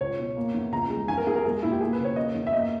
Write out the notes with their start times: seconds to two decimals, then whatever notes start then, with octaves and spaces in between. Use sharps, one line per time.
0.01 C#2 C#5
0.19 B2
0.37 A#3
0.54 E2
0.72 C#2 A#5
0.90 G#3
1.08 E2 G#5
1.17 A#4
1.27 E2 G#4
1.36 A#4
1.44 G#3 G#4
1.63 A#2 E4
1.72 G4
1.81 A#3 G#4
1.93 B4
1.98 C#3
2.05 C#5
2.16 A#3 D#5
2.35 E2
2.47 E5
2.53 A#3 D#5